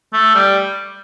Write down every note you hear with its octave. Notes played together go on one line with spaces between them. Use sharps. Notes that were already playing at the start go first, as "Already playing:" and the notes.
A3
G3